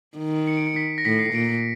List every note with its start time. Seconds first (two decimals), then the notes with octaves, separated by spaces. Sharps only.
0.17 D#3
0.47 C#7
0.57 D7
0.67 C#7
0.76 B6
0.98 A#6
1.05 A2 B6
1.19 C7
1.34 A#2 D7